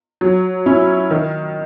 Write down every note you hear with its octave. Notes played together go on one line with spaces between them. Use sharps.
F#3
C#4 E4
D#3